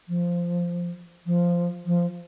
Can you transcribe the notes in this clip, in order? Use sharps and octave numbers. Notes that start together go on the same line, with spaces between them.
F3
F3
F3